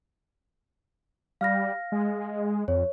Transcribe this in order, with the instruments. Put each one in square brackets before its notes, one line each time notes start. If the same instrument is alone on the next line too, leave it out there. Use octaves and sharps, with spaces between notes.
[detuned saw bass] G3 [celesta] F5 F6 A#6
[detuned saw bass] G#3
[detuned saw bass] F2 [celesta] C#5